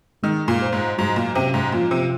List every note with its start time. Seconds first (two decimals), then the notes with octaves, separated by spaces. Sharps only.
0.23 D#3 G#3
0.48 A#2
0.61 C5
0.73 G#2
0.98 G#2 F#3
1.16 A#2
1.35 C3 C#4
1.54 G#2
1.72 A#2 F3
1.91 C3